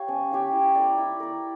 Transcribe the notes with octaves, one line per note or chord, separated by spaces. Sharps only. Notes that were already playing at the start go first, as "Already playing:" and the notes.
Already playing: G4 C#5 F5
C#4
G4 C#5 F5
E4
A#4 D5
E4
A#4 D5